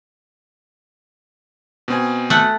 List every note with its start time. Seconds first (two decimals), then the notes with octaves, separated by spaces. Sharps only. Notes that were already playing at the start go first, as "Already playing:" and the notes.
1.88 B2 C4 G#5
2.30 A3 F#5